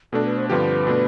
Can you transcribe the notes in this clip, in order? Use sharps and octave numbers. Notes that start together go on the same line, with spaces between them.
B2 A3 D4 A4
B4
C5
G2 D3 F3 C4 G4 B4
B2 A3 D4